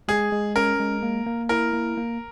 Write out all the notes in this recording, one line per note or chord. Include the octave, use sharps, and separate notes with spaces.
G#3 G#4
G#3
C#4 A#4
G#3
A#3
A#3
E4 A#4
A#3
A#3